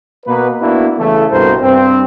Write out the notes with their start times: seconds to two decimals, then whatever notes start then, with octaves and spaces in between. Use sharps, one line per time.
0.26 B2 A#3 B4
0.60 A#3 B3 D4 E4 F#4
0.98 C#3 E3 A3
1.31 C2 G2 B2 A#4 C5
1.61 G2 C4